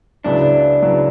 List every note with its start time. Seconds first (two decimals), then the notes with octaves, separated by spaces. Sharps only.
0.24 C#2 C#3 F#3 B3 D4 E4
0.82 C#2 C#3 F#3 B3 E4